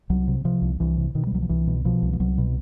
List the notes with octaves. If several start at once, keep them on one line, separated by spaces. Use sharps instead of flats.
C2 F#3
C3
C3 F3
C2
C2 E3
C3
B2 D#3
G3
C2 F#3
F3
C2 E3
B2
B2 F3
C2
F3
C2 F#3
B2